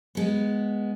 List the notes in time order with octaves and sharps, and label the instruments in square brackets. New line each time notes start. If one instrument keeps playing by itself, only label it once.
[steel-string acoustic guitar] G#3 B3